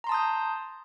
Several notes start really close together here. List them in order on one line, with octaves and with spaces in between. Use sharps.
A#5 C6 A5 D#6 G6